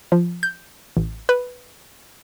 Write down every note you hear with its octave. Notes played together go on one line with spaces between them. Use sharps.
F3
G6
A1
B4